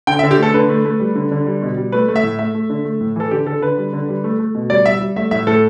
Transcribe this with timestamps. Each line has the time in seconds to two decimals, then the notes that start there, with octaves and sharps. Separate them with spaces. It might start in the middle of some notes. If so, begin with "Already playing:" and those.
0.07 D3 G5
0.19 E5
0.23 D3
0.31 G4
0.38 A3 A4
0.54 D3 B4
0.69 A3
0.85 A3
1.00 G3
1.15 D3
1.31 D3
1.46 G3
1.62 B2
1.77 G3
1.92 A3 B4
2.08 A3
2.16 E5
2.23 A2
2.39 A3 E5
2.54 A3
2.70 D3
2.85 A3
3.01 A2
3.16 E3 A4
3.31 D3 G4
3.46 D3 A4
3.62 D3 B4
3.77 G3
3.93 D3
4.09 G3
4.24 A3
4.39 A3
4.55 B2
4.70 G3 D5
4.85 G3 E5
5.00 G3
5.16 A3 E5
5.31 A2 E5
5.47 A2 A4